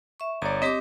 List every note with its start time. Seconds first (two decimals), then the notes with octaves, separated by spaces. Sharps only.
0.20 E5 C#6
0.42 G1 C#5 D5 A#5
0.62 C4 G4 D#5 D6 B6